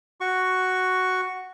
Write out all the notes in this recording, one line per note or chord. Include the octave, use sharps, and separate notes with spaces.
F#4 C#6